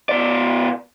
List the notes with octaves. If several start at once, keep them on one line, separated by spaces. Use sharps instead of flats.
B2 D5